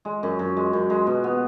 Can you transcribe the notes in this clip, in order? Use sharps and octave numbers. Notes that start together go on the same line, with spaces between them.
G#3
F#2
F#2
G#3
F#2
G#3
B2
B3